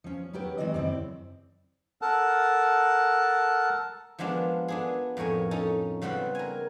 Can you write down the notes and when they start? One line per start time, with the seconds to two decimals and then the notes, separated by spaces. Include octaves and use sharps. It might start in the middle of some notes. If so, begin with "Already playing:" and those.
0.04 F3 C#4
0.33 F#3 C#4 G4 A#4 B4
0.58 E3 G#3 A3 C4 D5 D#5
0.74 F#2 C#3 C4 E4 D5
2.02 A4 A#4 F#5 A5
4.18 F3 G#3 B3 D4 F4
4.68 B3 D4 G#4
5.17 F2 A2 A#4 C#5 G#5
5.51 C#4 D#4 A4
6.02 C#3 G3 B3 C4 F#5
6.35 A#4 G#5